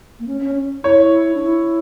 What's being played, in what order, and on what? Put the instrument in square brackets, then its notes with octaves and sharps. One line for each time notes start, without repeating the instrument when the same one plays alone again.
[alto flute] A#3
C#4
C#4
C#4
[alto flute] E4 [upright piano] C#5
[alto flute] D4
E4